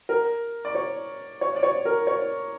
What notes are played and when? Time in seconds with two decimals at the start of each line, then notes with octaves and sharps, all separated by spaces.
0.09 A#4
0.65 D5
0.75 C#5
1.41 C#5
1.56 D5
1.63 C#5
1.85 A#4
2.07 C#5